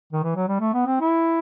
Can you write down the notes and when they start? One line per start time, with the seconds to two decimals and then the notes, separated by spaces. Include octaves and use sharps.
0.13 D#3
0.24 E3
0.36 F#3
0.48 G3
0.60 A3
0.74 B3
0.86 C4
1.00 E4